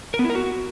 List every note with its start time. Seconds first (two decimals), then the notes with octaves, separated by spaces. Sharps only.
0.14 A#4
0.19 B3
0.24 E4
0.30 A#4
0.35 F#4